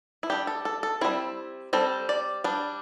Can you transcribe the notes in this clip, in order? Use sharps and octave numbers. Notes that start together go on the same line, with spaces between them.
E4
G3 D4 G4
A4
A4
A4
G3 C4 E4
G3 C4 A4
D5
G3 D4